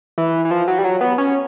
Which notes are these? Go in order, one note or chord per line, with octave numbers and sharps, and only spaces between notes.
E3
E3
F3
F#3
G3
F#3
B3
C#4